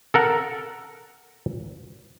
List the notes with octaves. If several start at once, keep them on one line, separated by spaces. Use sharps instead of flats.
A4 A#4 F#5